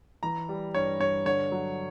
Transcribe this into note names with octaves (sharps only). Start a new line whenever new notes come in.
E3 A#5
G3
G2 C#5
G2 C#5
D3 C#5
F#3